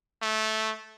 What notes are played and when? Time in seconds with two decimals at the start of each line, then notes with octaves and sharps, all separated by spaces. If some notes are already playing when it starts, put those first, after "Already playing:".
0.22 A3